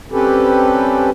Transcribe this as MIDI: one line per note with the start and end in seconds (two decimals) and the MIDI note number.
0.12 1.10 55
0.12 1.10 60
0.12 1.10 61
0.12 1.10 67
0.12 1.10 69
0.12 1.10 71